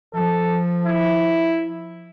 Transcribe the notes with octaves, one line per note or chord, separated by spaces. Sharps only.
F3 A4
E4